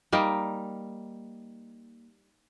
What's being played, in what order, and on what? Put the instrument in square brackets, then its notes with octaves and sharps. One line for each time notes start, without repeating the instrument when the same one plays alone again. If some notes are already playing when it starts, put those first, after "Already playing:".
[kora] G3 A#3 D#4